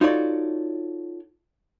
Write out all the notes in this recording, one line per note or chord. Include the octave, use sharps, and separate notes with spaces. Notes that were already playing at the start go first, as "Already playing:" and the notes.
D#4 F4 F#4 A4 C#5 D5